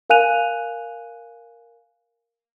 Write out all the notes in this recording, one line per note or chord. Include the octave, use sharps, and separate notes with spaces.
A#4 F5 G#5 F#6 D#7 F7